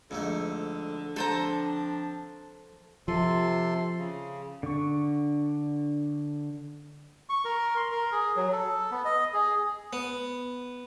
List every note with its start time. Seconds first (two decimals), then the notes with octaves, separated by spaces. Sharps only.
0.11 F2 G#2 D3 A3
1.16 F3 C4 D4 A4 B4 C5 A5 A#5
3.08 C3 F3 A4 C6
3.99 C#3
4.63 D3 C#6
7.29 C#6
7.45 A#4
7.76 C6
7.92 A#4
8.12 G#4
8.36 F#3
8.52 A4
8.91 B3
9.05 D#5
9.34 G#4
9.93 B3